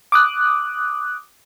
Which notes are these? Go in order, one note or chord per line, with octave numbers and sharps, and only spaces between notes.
D6 D#6 F#6